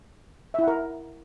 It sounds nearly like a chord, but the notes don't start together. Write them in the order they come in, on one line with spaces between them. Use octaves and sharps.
E5 E4 F#5 A#4